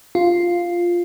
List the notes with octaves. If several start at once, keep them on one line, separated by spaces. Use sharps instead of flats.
F4